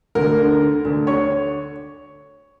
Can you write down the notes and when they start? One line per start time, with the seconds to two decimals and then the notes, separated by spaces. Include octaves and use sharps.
0.15 D2 A#4
0.38 D3
0.61 D3
0.85 D2
1.07 D3 C#5